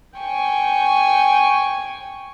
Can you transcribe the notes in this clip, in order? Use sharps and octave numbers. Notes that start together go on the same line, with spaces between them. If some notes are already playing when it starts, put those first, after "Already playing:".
G5 G#5 C#6